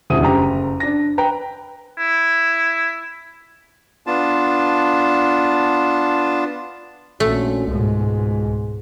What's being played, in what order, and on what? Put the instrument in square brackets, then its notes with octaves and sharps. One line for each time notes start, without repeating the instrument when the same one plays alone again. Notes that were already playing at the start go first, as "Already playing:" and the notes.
[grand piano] D#1 D2 E4 D#6 D#7
F#1 G4 A#5
D4 A#6
B4 G5 A#5
[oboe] E4
[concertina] B3 D4 F4 A5
[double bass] A#1 [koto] A3 [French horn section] C#4 F#4
[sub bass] C#2 [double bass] G#2 B2 [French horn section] G#3